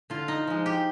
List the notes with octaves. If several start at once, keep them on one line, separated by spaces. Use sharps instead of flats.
D3 F4
D#4
F3 G#3
G4